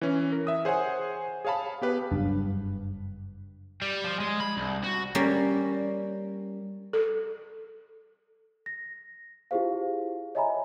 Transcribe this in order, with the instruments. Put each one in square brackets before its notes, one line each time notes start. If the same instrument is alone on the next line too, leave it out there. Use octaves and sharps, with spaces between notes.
[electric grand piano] E3 C#4
A#4
E5 D#6
G#4 C5 C#5 F#5 G#5
G#4 C#5 F5 A5 B5
B3 G4 B4 F5
[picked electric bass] F#1 G2 D4
[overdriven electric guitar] G3
F3
G#3
B5
C2
F#4
[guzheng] G3 A#3 C#4
[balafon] A4
[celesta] A#6
E4 F4 G4 G#4 C5 F5
C#5 D#5 E5 G#5 A#5 B5